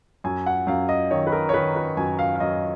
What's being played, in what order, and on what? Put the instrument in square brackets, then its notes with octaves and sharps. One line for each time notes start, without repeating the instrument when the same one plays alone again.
[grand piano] F#2 G#5
F#5
F#2 F5
D#5
D#3 C#5
B4
A#4
C#5
D#3 B4
B4
F#2 G#5
F5
F5
F#2 D#5